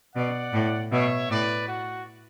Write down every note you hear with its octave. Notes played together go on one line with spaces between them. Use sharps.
B2 D5 F#5
A2
B2 C#5 E5
A2 B4 D5
F#4